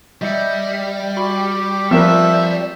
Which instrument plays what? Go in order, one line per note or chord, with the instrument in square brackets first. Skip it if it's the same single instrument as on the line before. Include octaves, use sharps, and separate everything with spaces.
[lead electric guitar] G3 [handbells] D#5 E5 C#7
[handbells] F#4 B5 [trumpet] G4
[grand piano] F3 A#4 B4 [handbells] C4 C#6 [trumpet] E5